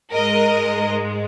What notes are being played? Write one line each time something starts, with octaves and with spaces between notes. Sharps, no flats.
G#2 G#3 A#4 D#5